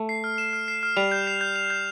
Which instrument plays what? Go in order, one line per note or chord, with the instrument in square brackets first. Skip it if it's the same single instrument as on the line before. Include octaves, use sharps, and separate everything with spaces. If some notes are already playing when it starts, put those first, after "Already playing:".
Already playing: [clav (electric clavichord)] A3
[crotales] C7
F6
E7
F6
C7
F6
[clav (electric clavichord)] G3 [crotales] F7
[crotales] G6
C7
G6
F7
G6